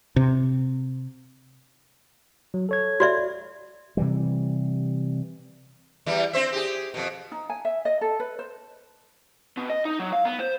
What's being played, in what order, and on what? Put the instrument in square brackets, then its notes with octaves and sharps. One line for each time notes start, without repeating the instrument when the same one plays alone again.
[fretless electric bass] C3
[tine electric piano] F#3
A4 C#5 G#6
[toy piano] F#4 D5 E5
[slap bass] C3 E3 G3
[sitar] E2 E3 G3
C4 C5 E5
G4 G#4
F2 B2
[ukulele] D#4
G#5
E5
D#5
A4
B4
C5
[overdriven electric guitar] B2
D#5
D#4
F#3
F5
B3
C5